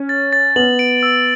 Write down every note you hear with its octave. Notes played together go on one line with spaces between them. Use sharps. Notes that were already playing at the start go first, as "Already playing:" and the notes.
Already playing: C#4
A6
A6
B3 F#7
D7
E6